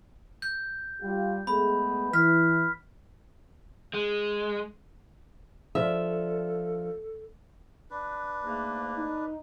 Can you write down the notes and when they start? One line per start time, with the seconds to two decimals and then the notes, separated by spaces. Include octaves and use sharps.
0.42 G6
1.01 G3 F4 G4
1.47 G#3 A3 B3 B5
2.13 E3 F6 B6
3.94 G#3
5.75 F3 D4 F4 A4 E5
7.91 D4 B4
8.44 G#2 A3 A#3
8.97 D#4